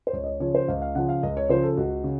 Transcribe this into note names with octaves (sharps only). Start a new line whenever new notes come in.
C5
C#2 C#5
D#5
C#5
C#3 F3 C#5
C5
C#2 F5
F5
C#3 F3 F#5
F5
C#2 D#5
C#5
C#3 F3 C5
A4
C#2 F#4
C#3